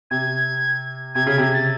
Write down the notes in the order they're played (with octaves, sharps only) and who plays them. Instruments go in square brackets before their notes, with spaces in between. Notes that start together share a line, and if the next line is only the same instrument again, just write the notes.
[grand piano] C3 [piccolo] G#6
[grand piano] C3 [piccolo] G#6
[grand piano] C#3 [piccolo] G#6
[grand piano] C3 [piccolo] G#6
[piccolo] A6